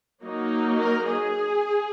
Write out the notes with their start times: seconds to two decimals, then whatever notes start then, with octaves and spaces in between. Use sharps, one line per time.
0.23 F#3 A#3 D#4
0.79 A#4
1.08 G#4